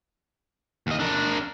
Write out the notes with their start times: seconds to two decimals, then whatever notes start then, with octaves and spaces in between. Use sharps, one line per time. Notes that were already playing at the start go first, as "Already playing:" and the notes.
0.87 D#2 D#5
1.00 D4 A#4